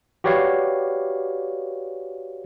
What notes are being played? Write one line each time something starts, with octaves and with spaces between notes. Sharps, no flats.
F#4 G4 B4 C#5 D5 F5